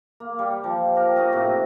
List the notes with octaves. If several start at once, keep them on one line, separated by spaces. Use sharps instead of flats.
A#3
G3
F3
G4 A#4
A#3 D#4 F#4 D#5
A2 C3